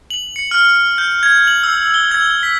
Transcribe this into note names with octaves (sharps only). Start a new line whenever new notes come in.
F#7
C#7
F6
G6
G#6
F#7
E6
G7
G#6
B6